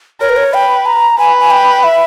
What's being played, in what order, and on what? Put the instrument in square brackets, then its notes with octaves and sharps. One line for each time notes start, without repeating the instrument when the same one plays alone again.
[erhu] A#4 [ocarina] C#5
[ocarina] B4
C#5
[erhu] B4 [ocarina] G5
[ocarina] A#5
[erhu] B4 [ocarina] G#5
[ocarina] G#5
G5
E5